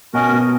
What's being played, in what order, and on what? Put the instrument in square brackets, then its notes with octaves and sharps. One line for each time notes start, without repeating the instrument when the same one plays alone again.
[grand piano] B2 [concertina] C#4 F#4 A#4 D#5
[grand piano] B2